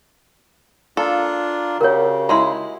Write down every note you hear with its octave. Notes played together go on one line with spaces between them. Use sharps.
A#3 D4 F4 A4
C#3 F#4 G4 A#4 C#5
G#3 E4 A#5 C6